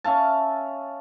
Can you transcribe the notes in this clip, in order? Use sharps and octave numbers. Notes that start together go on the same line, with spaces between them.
C#4 E5 F5 A5